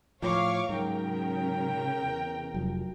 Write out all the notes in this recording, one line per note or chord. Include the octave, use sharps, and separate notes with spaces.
A2 F3 C#5 F5 C#6 D6
G#2 C#3 F#3 A#4 G5
E2
F1 F#3